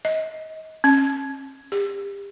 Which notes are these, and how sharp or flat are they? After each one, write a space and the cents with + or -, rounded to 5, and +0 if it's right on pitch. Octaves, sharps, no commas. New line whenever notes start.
D#5 +30
C#4 -30
G4 +35